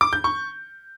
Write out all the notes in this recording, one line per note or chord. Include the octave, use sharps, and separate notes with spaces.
D6
G6
C#6